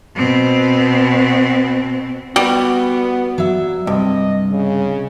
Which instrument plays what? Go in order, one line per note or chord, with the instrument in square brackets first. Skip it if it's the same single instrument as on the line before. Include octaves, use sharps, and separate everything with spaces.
[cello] B2 C4
[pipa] G3 [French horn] B3 [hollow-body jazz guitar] F#4
[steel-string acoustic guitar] F#3 E5
[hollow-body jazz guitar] G2 [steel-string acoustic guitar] C3 [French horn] D#5
[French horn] C#3